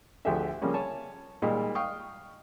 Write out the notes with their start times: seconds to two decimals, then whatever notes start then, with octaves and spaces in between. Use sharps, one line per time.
0.25 D2 F3 A3 G4 G#4 E5
0.62 C#3 F3 G3 A#3 C#4
0.74 C#5 G#5 A5
1.42 A#2 G3 G#3 D#4
1.75 F5 G5 C#6 D#6